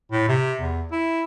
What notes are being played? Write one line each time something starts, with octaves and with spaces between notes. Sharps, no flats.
A2
C3
E2
E4